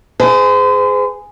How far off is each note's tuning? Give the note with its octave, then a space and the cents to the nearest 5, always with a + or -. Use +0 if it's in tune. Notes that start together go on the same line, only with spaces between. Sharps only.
G#4 +0 C5 -40